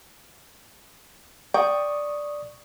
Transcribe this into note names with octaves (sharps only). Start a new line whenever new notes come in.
D5 G5 C#6 D#6